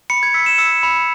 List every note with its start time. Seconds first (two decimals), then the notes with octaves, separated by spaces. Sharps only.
0.10 B5 C#7
0.23 G#6
0.34 E6 B6
0.46 E7
0.58 E6 C#7
0.83 B5